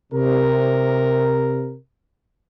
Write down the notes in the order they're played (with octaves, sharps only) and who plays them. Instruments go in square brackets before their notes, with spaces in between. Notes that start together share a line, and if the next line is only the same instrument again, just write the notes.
[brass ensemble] C3 A#4